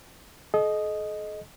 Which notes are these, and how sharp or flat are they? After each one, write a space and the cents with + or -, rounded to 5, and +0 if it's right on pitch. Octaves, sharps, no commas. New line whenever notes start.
A4 -45 D#5 +0